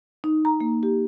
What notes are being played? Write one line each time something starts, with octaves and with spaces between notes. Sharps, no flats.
D#4
A#5
A#3
G4